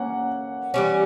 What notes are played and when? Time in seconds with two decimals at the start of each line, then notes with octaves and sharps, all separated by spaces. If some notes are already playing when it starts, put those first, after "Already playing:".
Already playing: A#3 C#4 F#5
0.74 E3 G3 C#4